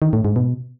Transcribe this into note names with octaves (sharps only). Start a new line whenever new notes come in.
D#3
A2
G#2
B2